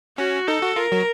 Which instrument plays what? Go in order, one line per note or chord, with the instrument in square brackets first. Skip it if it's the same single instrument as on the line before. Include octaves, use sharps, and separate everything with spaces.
[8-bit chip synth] C#4 [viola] F#4
[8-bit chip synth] D#4 [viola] A4
[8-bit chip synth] F#4
[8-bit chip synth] F4 [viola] A#4
[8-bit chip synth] F#3